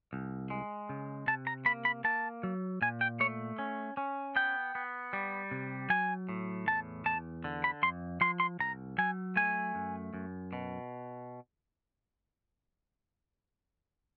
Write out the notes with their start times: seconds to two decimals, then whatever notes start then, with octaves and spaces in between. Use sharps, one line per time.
0.13 C2
0.50 G#3
0.89 C#3
1.27 C3 A5
1.47 A#5
1.66 A#3 B5
1.85 B5
2.04 A#3 A5
2.43 F#3
2.82 A#2 G#5
3.01 G5
3.20 A3 C#5
3.59 C#4
3.97 C#4
4.36 B3 G5
4.75 B3
5.13 G3
5.51 C3
5.90 F#3 G#5
6.29 A2
6.67 E2 A5
7.05 E2 A5
7.44 D3
7.64 B5
7.83 F2 C6
8.21 F3 C6
8.40 C6
8.59 C2 A#5
8.98 F#3 G#5
9.36 A3 G#5
9.75 F#2
10.14 F#2
10.53 B2